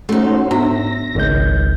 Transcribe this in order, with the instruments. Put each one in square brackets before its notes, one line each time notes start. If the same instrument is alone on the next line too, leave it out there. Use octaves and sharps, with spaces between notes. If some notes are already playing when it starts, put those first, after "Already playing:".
[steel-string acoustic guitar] A3 D#4 [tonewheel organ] C#4 F#4 C5
[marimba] G#2 B3 D4 [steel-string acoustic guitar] E5 [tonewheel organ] A#6
[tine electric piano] G#1 C#2 G6